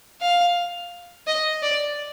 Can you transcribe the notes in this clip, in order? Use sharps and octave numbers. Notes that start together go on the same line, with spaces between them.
F5
D#5
D5